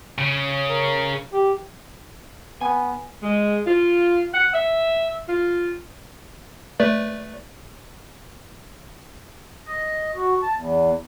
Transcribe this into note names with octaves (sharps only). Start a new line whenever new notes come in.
C#3
A#4
G4
B3 G#5
G#3
F4
F#5
E5
F4
A3 B4 D5
D#5
F#4
A5
E2